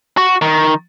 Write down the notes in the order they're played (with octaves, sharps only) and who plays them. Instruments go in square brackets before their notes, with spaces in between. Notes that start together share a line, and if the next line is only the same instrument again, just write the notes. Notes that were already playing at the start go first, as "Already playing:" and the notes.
[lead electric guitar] F#4
D#3